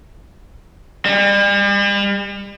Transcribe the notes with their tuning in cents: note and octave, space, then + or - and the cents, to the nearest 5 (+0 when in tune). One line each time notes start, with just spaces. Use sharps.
G3 +40